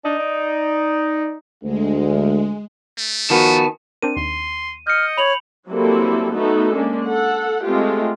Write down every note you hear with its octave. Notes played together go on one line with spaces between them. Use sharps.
D4 D#4
D5
D2 G#3
A3
D#3 F3 B3 F#4 G#5 A5
C4 D4 A#4 D#7
D#2 C6
D#5 F6 G6 C#7
C#5 B5 F7 F#7
F#3 G3 A#3 C4 E4 A4
A3 B3 D#4 F#4 A4
G#3 A#3 C#4 D4
A4 F#5
G#3 A3 C4 F4 G4